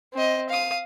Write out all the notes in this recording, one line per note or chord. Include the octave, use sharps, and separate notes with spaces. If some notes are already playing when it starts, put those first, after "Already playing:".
C4 D#5
F5 D#6